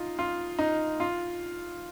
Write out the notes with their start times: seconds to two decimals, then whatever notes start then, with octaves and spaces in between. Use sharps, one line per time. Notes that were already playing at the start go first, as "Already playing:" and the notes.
Already playing: D#4 F4
0.19 F4
0.59 D#4
1.00 F4